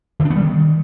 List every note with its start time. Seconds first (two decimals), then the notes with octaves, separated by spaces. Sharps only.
0.20 D#3
0.25 D4
0.30 B3
0.36 G3
0.41 D#3